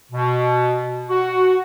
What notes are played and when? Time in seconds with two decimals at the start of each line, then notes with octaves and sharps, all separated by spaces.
0.12 B2
1.10 F#4